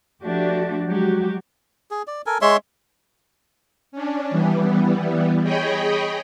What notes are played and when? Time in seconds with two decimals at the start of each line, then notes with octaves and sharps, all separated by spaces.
0.23 F3 A3 D4 F#4 G4
0.86 F#3 G#3 F#4 G4
1.91 G#4
2.07 D5
2.26 A4 A#4 G#5
2.41 G#3 C#5 E5 C6
3.92 C#4 D4
4.30 E3 G3 B3
5.43 G#4 C#5 D#5 G5 B5